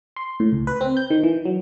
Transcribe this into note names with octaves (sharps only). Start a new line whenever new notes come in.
C6
A2
C#2
B4
C4
G6
D#3
E3
F#3